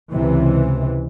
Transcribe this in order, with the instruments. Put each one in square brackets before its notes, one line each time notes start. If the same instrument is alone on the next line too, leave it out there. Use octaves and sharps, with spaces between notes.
[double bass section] C#2 C3 E3